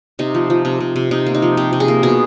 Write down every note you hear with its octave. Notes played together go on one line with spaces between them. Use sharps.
C3 D#4
F3
F3
C3
C3
C3
C3 D#4
A#3
D#4
F3
C3 G4
C3
G#4
A#3
B2 G#4